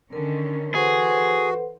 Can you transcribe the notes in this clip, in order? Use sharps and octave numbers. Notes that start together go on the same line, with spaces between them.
D3 D#3 C#4 A#4
E3 F#4 G#4 A4 B4 C5 F#5